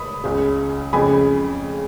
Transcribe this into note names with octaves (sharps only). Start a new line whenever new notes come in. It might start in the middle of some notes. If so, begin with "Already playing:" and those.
Already playing: B5 D#6
C#2 C#3
F2 C#3 G#5 B5